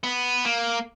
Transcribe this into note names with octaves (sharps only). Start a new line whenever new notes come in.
B3
A#3